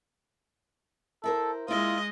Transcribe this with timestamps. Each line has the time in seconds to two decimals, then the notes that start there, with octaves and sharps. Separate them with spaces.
1.24 E4 A4 A#4 C5
1.68 G#3 A#3 E4 F4 D#5